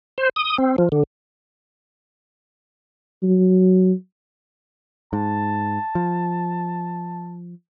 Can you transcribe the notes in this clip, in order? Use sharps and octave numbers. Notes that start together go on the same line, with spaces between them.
C5
D#6
C4
F3
D3
F#3
G#2 A5
F3